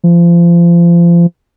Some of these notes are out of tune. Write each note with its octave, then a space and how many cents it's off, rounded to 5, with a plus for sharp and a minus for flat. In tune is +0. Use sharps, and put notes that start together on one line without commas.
F3 -30